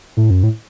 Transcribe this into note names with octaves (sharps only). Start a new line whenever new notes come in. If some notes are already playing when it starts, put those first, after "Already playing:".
A2
F#2
A2